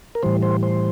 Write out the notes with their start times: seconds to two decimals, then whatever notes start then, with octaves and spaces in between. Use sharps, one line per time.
0.15 A#4
0.23 A2 E3 G3 C5
0.43 C5
0.63 C5